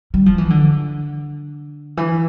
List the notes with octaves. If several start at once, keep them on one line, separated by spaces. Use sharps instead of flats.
G3
F3
E3
D3
E3